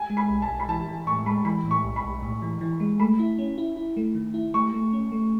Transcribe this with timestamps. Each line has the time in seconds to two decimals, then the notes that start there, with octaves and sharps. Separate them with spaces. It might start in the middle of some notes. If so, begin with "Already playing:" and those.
Already playing: G#5
0.10 G#3
0.17 B5
0.29 B1
0.42 A5
0.49 B1
0.60 B5
0.68 E3 A5
0.88 E3
1.07 A2 C#6
1.26 G#3 B5
1.45 E3 B5
1.65 A2
1.71 C#6
1.84 B1
1.96 B5
2.04 B1
2.22 A2
2.42 E3
2.61 E3
2.80 G#3
3.00 A3 B5
3.19 E4
3.38 C#4
3.58 E4
3.76 E4
3.97 A3
4.15 D#3
4.34 E4
4.54 A3 C#6
4.73 A3
4.93 C#4
5.12 A3